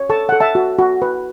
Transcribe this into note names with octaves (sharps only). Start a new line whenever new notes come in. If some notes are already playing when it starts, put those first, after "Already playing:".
Already playing: C#5
A4 A5 C#6
A4 F#5
E5 A5
F#4
F#4
B4